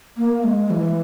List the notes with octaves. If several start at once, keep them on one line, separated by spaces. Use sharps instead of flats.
A#3
G#3
E3